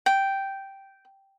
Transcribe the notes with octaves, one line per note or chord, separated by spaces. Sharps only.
G5